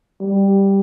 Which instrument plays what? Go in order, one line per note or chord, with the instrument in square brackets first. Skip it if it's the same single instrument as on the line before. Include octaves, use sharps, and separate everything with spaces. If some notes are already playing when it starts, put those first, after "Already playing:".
[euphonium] G3